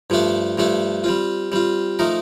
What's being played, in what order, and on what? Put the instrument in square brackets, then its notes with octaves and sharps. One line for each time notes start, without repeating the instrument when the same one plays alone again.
[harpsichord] G2 F3 A3 D4 A4
G2 F3 A3 D4 A4
G3 C4 F4
G3 C4 F4
F3 A3 D#4 A#4